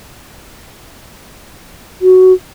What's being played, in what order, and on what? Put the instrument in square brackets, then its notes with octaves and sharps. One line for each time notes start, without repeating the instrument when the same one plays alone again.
[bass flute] F#4